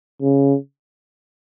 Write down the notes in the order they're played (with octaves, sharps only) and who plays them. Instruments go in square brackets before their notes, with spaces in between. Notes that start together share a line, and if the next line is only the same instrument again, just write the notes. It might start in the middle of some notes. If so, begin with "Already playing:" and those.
[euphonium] C#3